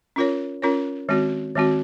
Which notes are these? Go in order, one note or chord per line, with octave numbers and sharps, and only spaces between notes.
C#4 F4 A#4 C#5
C#4 F4 A#4 C#5
D#3 G#3 C4 F#4
D#3 G#3 C4 F#4